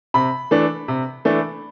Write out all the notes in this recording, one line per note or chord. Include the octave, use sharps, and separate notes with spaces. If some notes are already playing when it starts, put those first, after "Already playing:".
C3 B5
E3 A3 D4
C3
E3 A3 D4